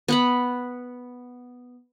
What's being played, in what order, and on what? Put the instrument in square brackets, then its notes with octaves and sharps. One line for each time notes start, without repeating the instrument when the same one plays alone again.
[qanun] B3 F#5 B5